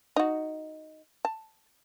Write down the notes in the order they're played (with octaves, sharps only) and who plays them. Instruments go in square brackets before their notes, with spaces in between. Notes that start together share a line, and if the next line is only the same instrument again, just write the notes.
[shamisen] D#4 F#4
A5